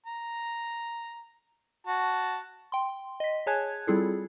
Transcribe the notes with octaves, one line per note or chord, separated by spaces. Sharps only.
A#5
F#4 A5
G5 C6
D#5 B6
G#4 C#5 G#5 A5 F#6 G#6
G3 C4 E4 F4 G#4 A4